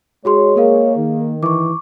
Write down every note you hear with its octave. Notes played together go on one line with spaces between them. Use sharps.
G#3 F#4 G#4 C#5 C6
A#3 G#4 A#4 F5
D#3
E3 C#6 D6